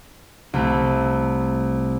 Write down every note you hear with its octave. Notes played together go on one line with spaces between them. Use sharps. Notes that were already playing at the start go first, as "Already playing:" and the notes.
C2 A3 A4